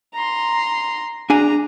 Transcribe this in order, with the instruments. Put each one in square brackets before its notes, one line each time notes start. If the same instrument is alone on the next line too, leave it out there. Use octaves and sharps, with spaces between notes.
[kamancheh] A#5 C6
[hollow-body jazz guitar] D4 G#4 G#5 [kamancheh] A#5